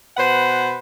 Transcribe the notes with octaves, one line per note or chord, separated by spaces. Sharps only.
B2 B4 C5 F#5